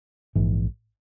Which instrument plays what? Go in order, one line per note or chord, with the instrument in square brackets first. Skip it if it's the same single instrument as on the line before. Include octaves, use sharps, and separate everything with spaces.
[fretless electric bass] A#1 G#2 E3